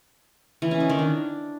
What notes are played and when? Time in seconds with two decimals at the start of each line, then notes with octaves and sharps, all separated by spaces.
0.62 E3
0.71 C#4
0.80 D#4
0.89 D#3
0.99 D4